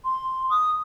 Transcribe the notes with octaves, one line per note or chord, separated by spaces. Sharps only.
C6
D#6